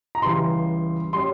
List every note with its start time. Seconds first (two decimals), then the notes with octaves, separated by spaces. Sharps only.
0.15 A#5
0.22 C#2 C#3 E3 G3 C6
1.13 G3 C#4 C6